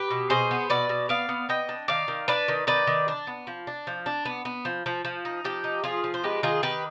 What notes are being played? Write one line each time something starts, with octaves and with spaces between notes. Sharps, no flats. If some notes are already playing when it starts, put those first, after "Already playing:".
Already playing: G4 B4
B2
B2 G#4 C5
B3
B2 B4 D5
B2
B3 D5 F5
B3
B3 D#5 G5
D4
D#3 D5 F5
D#3
D4 B4 D5
D#3
D#3 B4 D5
D#3
D4
B3
F3
D4
F3
D4
B3
B3
F3
F3
F3
D#4
F3 G4
D#4
F3 F4 G#4
F3
C5
G#3 G4 B4
D#3 F4 G#4
D#3 G4 B4